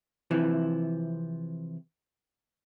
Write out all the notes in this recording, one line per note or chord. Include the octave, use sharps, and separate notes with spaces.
C3 E3 F3 E4